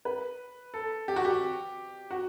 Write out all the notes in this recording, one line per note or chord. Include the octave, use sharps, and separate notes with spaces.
B4
A4
G4
F#4
G4
F#4